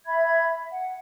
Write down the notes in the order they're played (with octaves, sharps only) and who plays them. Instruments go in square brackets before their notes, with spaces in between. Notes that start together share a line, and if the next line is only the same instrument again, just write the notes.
[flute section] E5 B5 G#6
F#5